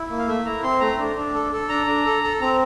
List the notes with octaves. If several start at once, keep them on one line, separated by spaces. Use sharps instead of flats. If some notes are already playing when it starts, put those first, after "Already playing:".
Already playing: E4
A#3
F5
A3 E5
E4 A#5
C4 C6
A3 A#5
D4
D4
A4
A4
D4 A#5
D4
A4
A4
C4 A#5